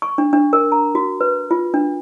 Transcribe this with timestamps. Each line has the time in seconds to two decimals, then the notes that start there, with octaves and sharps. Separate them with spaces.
0.02 C#6
0.18 D4
0.33 D4
0.53 A#4
0.72 A#5
0.95 F#4
1.21 B4
1.51 F4
1.74 D4